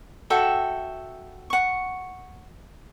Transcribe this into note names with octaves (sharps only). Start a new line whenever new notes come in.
F#4 A4 E5 G5
F#5 C#6